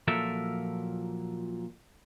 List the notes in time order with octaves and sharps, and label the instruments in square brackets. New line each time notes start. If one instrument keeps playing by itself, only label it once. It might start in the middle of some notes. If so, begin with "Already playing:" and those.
[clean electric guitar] A#2 F3 F#3 A4 A#4 E5